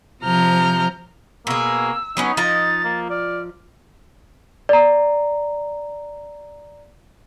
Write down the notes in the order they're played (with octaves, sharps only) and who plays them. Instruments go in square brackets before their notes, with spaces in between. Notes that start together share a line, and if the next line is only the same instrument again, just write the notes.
[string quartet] C3 F3 A#5 F6 G6
[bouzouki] B2 G#4 [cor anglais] A#3 [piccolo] E6
[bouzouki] F#3 B3 C#4 [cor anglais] D#4
[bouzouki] F3 D#5 A#5 [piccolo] A6
[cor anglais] A#3
[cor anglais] D5 [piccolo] F6
[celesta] D5 A#5